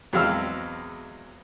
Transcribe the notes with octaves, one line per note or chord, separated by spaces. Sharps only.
E2 F#3 G#3 C4 F5 E6